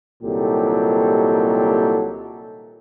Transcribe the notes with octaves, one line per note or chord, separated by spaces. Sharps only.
C2 A#2 D#3 F#3 G4 A4